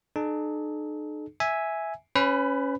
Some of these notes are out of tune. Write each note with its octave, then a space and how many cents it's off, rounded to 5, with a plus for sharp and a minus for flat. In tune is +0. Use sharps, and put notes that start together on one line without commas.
D#4 -45 A4 -45
E5 -5 G#5 +0
C#4 +0 B4 +30 B5 +0